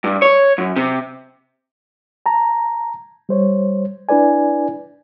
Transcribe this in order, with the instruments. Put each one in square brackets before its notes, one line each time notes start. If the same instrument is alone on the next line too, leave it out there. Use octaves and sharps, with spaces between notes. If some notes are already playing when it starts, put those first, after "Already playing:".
[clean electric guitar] G2
C#5
F#2
C3
[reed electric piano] A5 A#5
G3 C5 C#5
D4 E4 B4 D5 G#5